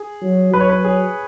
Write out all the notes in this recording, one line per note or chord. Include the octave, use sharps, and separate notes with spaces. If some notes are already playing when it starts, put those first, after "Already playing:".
Already playing: G#4
F#3
F#3 B4
C#5
B4
G#4